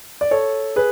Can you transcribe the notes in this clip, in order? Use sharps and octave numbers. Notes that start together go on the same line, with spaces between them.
D5
A4 C#5
G#4 B4